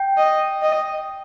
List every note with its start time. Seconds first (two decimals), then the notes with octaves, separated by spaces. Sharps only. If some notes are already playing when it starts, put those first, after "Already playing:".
Already playing: G5
0.17 D#5
0.62 D#5